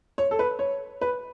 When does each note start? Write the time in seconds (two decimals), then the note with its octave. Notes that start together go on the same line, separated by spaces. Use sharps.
0.18 C#5
0.31 A4
0.39 B4
0.59 C#5
1.01 B4